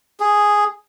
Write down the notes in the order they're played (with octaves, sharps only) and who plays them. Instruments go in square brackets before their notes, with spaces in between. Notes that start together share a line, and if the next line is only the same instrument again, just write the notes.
[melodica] G#4